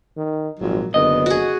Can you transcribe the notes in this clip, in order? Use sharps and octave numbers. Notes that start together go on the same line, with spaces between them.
D#3
G#1 A#2 F3 F#3
F#1 D3 B3 D#5
F#4 G#4